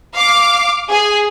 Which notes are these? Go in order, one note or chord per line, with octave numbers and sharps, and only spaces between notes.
F5 D6
G#4